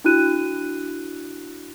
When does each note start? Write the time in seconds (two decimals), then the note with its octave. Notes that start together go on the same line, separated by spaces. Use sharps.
0.04 D4 E4 F#4 F#6 D#7